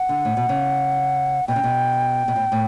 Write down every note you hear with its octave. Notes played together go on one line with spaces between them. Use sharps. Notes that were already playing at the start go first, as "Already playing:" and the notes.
Already playing: F#5
D3
A2
B2
C#3
B2 G5
C#3
B2
B2
A2
A2